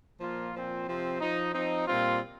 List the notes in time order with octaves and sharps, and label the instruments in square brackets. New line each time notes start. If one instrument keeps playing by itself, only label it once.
[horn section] A#2 F3 A#3 F4
A#2 F3 C4
C3 F3 C4
F3 D#4
F3 C4 D#4
A#2 G3 C4 F4